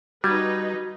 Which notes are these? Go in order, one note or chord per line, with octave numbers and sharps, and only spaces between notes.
G3 D#4 F#4 B4 G#6